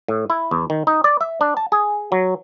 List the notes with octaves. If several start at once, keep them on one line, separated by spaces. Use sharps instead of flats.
A2
E4
E2
D#3
D#4
D5
E5
D4
A5
G#4
F#3